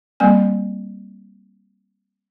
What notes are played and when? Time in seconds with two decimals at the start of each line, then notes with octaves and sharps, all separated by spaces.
0.20 G3 A#3 C4 G#5